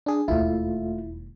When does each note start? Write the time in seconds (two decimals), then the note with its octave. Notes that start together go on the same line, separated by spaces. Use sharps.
0.06 D4 G#4
0.28 E1 D#2 A3 E4 F4